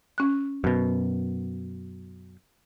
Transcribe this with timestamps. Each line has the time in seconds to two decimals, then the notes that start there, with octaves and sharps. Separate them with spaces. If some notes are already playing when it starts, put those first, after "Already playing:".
0.18 C#4 F#6
0.64 F#2 B2